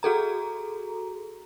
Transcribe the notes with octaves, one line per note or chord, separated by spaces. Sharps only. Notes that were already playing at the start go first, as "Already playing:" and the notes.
F#4 G#4 A4 A#5